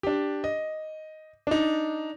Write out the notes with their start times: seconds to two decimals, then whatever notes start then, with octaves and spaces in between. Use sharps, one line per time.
0.03 D4 G4
0.44 D#5
1.47 D4 D#4